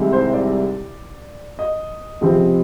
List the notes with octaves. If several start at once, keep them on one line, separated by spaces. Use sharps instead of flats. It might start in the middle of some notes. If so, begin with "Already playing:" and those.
Already playing: C2 C3 D#3 G#3
C5
D5
D#5
C#2 C3 F3 G#3 C4